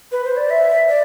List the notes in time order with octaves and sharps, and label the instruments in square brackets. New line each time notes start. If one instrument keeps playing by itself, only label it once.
[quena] B4
C5
D5
E5
D5